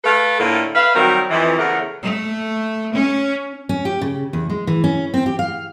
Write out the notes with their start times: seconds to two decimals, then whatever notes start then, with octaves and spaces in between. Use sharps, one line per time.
0.04 A3 A4 B4 F5
0.38 A2 D3 A3 A#3 F4
0.74 B4 E5 F5
0.95 D#3 F#3 G3 C4 A#4
1.30 F2 E3
1.58 E2 C#3 A3 A#4 F#5
2.02 A3
2.93 C#4
3.69 C#4
3.85 G4
4.01 C#3
4.33 E2
4.50 G#3
4.67 E3
4.84 C#4
5.14 C4
5.26 G4
5.39 F5